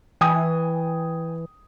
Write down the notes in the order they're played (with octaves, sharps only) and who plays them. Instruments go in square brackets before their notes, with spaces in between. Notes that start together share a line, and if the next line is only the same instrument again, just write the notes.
[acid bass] E3 [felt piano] G5 G#5 D#6